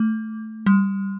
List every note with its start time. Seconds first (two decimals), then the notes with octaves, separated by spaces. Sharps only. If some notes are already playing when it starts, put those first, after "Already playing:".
Already playing: A3
0.66 G3